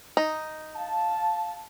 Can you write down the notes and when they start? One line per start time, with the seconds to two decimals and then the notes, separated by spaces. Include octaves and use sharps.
0.17 D#4
0.76 F5 A5